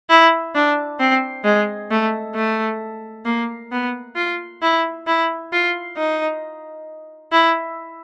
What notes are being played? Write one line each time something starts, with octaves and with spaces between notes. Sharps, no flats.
E4
D4
C4
G#3
A3
A3
A#3
B3
F4
E4
E4
F4
D#4
E4